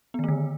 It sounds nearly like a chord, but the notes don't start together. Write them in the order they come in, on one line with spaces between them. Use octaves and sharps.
B3 D#3 A3 D3